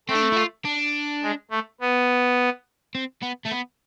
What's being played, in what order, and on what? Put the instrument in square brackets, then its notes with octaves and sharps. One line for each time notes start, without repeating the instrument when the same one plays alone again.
[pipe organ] A3 [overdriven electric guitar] C4
[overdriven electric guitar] D4
C4
E4
F4
D4
[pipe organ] G#3
A3
B3
[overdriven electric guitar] C4
B3
A3
B3